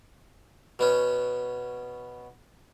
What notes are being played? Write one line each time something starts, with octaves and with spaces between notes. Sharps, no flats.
B2 B3 C#4